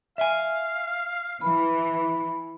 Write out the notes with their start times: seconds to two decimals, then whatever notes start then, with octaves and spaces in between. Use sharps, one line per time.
0.18 E5 F5 G#5
1.41 E3 B5